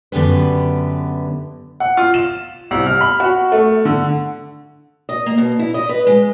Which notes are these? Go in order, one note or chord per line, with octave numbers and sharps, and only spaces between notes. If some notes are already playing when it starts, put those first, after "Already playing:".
F#2 D3 B3 G4 B4
F#5
F4
E7
C2
F6
B5
F#4
A3
D3
D#5
A#3
B2
E4
D#5
B4
G#3